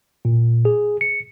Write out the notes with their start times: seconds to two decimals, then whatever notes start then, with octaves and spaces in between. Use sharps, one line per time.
0.25 A#2
0.65 G#4
1.01 C#7